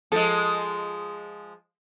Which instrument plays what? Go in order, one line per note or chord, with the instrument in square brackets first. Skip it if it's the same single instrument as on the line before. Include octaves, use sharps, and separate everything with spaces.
[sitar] F3 G#3 [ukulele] A4